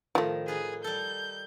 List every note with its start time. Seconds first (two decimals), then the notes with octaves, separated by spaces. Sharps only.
0.15 A2 D#3 F3 A3
0.48 D#4 F4 G#4 B4
0.84 G3 A4 G6